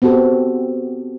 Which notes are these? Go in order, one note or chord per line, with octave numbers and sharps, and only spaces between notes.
B3 C4 F#4 G4 A4